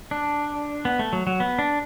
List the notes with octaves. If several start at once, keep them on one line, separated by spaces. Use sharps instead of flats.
D4
B3
A3
F#3
F#3
B3
D4